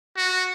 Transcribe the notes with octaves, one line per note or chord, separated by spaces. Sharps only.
F#4